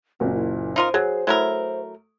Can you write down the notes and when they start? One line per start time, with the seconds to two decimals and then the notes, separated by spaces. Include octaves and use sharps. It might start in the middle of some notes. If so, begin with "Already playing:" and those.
0.20 F#1 A#2 C4 F#4
0.35 E4
0.76 D#4 F4 A#4 C5
0.94 F#3 G#4
1.27 F#3 A3 E4 A#4